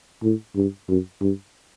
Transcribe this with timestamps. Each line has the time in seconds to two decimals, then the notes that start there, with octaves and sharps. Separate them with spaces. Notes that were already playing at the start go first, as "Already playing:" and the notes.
0.23 A2
0.56 G2
0.88 F#2
1.21 G2